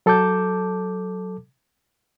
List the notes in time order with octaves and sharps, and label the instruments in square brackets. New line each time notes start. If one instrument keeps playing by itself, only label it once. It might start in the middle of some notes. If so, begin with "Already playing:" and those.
[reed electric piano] F#3 A4 A5 D6 G6